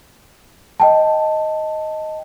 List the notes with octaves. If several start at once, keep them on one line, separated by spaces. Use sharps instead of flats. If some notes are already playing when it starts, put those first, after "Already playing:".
D#5 G5 A5